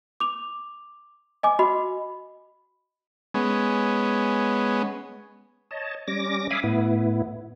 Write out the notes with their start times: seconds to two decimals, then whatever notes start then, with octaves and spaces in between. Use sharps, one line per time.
0.20 D6 F7
1.43 D#5 G#5 D6
1.59 F#4 D#5 B5
3.34 G#3 B3 C#4
5.71 C#5 D#5 A5
6.08 G3 C#4 D6 A#6
6.50 E5 F5 G#5 B5 D6 D#6
6.63 A2 B3 E4